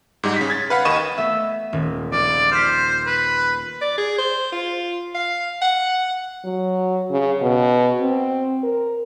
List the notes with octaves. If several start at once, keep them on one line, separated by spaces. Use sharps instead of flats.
G#2 G3 D#4
C#3 B6
G#6 A6
B4 F5 F#5 B5
D#2 D#3 D#5 C#6 D#7 E7
A3 B3 E5
D#1
A#1 D5
C5 F6 G6 B6
B4
D5
G#4
C5
F4
F5
F#5
F#3
C#3
B2
C4
A#4